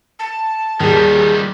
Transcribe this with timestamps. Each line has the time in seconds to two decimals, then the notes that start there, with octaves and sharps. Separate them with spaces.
0.19 A5
0.80 D#2 D#3 G3 G#4